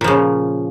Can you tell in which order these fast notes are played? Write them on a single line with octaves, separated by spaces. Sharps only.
A#2 F3 C#3